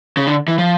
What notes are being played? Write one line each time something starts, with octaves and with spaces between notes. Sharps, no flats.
C#3
D3
E3
F3